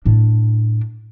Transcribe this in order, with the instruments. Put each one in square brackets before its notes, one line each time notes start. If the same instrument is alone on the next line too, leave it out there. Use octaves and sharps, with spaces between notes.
[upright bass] A2 D4